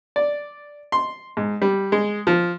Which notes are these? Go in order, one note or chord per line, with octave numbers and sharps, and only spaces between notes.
D5
C6
G#2
G3
G#3
F3